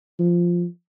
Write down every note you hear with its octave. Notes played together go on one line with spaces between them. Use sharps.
F3